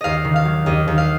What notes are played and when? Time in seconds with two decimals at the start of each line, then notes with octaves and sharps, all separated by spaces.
0.01 D#2 D#5 F5
0.25 D#3
0.36 F5
0.45 F#3
0.66 D#2 D#5
0.88 D#2
0.98 F5